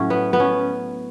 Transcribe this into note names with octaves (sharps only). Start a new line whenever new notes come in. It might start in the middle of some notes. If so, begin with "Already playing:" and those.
Already playing: A2 F#3 C#4
B3
B3
C#4